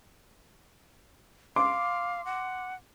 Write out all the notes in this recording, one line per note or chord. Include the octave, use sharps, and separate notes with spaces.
F5 C6 D6
F#5